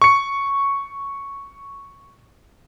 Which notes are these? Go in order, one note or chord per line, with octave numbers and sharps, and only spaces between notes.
C#6 C#7